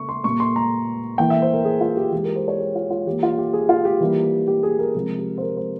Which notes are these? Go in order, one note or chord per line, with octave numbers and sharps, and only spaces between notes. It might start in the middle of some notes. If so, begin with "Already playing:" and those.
Already playing: C#3 A#3 C#6
C6
A#2 G3 A#3 C#6
C6
A#5
E3 A#3 G5
E5
C5
A#4
G#4
F4
G4
E3 G#3 G4
A#4
C5
C#5
G#4
F4
F4
E3 A#3 G4
F4
G4
G#4
F4
G4
E3 G3 A#3
G4
G#4
A#4
C3 F3 G#3 A#4
G4
C5
A#4
C5